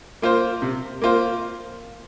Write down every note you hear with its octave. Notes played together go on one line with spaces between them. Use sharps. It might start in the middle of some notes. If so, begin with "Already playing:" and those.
A#3 F4 C5
C3
A#3 F4 C5